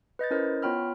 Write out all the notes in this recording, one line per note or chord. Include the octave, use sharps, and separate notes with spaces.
B4 D#5 G6 A6
C#4 E4 A#4 C5 D#5
B3 F4 C#5 G5 B5 F6